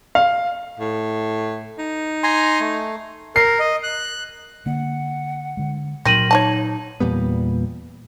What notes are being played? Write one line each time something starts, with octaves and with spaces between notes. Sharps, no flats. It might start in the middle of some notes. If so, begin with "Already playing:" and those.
F5
A2
D#4
G#5 A#5 C6
A3
A#4 C7
D#5
F#6
D3 A#3 F#5
D3 G#3
A#2 D#3 F#3 C4 A#4 A#6 D#7 F#7
D#4 C#5 D#5 A5
E2 A#2 G3 B3